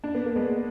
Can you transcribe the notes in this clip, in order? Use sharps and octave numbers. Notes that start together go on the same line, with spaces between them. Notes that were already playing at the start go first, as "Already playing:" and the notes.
D4
B3
A#3
G#3 B3